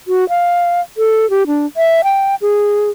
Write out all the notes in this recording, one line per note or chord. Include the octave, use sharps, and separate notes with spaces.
F#4
F5
A4
G4
D4
E5
G5
G#4